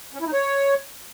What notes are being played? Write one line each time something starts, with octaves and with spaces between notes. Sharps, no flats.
C#4
E4
D#4
C#5